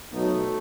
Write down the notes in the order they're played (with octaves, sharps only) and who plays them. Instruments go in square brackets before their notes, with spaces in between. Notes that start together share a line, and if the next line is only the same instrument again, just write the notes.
[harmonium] B2 F#3 B3 D#4 [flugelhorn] A3